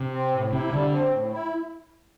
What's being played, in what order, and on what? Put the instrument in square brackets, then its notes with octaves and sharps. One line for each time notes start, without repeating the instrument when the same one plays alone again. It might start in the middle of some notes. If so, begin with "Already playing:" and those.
Already playing: [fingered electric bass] C3
[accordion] C4
A2
[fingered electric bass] C3 [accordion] E4
[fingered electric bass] D3 [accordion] G3
[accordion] C4
A2
E4